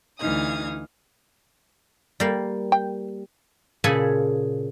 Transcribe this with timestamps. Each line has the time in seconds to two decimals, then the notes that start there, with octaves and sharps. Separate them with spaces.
0.20 D2 E3 D#4 F5 D#6 G#6
2.20 G3 A#3
2.72 G5
3.84 A#2 C#3 G#4 A4 G#5 B5